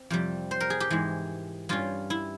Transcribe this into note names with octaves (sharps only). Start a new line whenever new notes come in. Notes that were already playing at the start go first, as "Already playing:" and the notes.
Already playing: C4
F2 C3 G3
C5
A#4
G#4
G4
G#2 E3 G#3
G2 G3 C#4 F4
E4